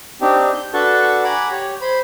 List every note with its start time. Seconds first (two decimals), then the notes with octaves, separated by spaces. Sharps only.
0.21 C4 D4 D#4 G4
0.54 G6
0.73 D4 F#4 A4 B4 A5 C#6
1.24 F#5 G#5 A#5 B5 D6
1.51 G4 C#5
1.81 C5 B5